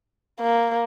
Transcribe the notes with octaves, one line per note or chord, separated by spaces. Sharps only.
A#3